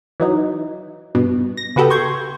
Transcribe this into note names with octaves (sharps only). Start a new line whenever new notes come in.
E3 F#3 D#4
G2 B2
A#6
C#3 B3 F#4 G4 A4
C6 C#6 G6 G#6